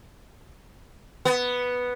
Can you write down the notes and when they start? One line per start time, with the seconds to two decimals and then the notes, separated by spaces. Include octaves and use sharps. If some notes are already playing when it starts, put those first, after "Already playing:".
1.25 B3